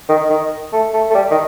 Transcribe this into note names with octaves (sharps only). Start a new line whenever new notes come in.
D#3
D#3
A3
A3
A3
G3
D#3